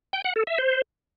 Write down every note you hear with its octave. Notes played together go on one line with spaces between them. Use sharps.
G5
F#5
A4
E5
C5